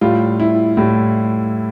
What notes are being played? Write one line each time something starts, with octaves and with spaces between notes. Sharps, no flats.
A2 G3 F4
E4
A2 G3